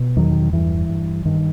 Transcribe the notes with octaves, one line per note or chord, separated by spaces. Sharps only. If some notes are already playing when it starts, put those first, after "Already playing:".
Already playing: B2
E2 D#3 F#3
G2 E3
G2
G2 D#3